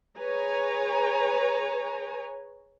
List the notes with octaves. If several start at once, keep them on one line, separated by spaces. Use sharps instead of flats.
G#4 B4 C#5 G#5 A#5